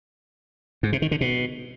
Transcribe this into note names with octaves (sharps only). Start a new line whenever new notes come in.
G#2
C3
D#3
D3
B2